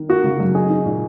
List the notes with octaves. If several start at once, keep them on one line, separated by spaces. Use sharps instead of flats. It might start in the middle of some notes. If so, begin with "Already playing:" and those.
Already playing: D#3
A#3 F#4
C#3
F#2
D#4 G#4
D#4
A#2